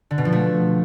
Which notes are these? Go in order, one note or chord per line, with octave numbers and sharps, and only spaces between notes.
D3
B2
F3
A3